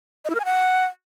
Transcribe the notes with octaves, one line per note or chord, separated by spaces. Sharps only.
D#5
E4
A#4
G#5
F#5